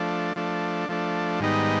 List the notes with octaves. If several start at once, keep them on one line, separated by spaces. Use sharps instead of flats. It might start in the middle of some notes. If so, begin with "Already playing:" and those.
Already playing: F3 A3 D4
F3 A3 D4
F3 A3 D4
G#2 D#3 G3 B3 D#4